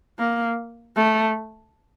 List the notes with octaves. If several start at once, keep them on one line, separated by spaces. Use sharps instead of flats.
A#3
A3